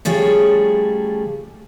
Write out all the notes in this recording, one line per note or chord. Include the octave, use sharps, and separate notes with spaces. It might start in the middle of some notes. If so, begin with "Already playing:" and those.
C#3 F3 G3 A3 G#4 C#5